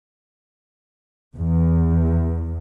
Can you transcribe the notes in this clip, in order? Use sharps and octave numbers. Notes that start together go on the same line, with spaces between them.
E2